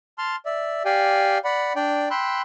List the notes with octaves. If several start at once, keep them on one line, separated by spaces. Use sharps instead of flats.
A5 C6 F6
D5 E5
G4 D5 F5 G5 G#5
D5 F#5 B5
D4 D5 G5
G5 B5 C6 E6 F#6